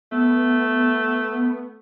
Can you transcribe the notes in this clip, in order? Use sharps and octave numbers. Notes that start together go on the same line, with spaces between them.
A3 B3